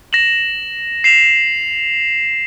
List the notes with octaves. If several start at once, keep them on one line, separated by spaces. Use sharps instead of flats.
A#6 E7 F#7
C7 E7 F7